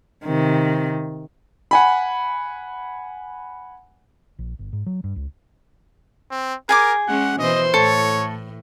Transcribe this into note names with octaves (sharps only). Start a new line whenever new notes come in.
C3 D#3
F#5 G#5 B5
A#1
G1
G#2
F#3
G2
C#2
C4
G#4 A#4 G#5 D6
G#3 C#4 F#5
B2 E3 C5 D#5
A2 A4 C#5